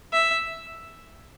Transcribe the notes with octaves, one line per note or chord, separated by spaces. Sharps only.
E5